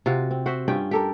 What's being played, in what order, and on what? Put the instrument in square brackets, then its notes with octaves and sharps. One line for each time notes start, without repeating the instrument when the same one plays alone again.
[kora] C3 F4 F#4 F5
C4
F#4 C5 E5
G2 C#4 F4 G5
G4 A4 A#4